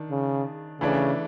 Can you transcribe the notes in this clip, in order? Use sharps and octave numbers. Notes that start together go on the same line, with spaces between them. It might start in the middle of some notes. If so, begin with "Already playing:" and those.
Already playing: D#3 D4
C#3
C#3 E3 A3 D4